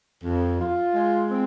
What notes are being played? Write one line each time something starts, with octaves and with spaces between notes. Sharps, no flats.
F2
F4
G#3
C4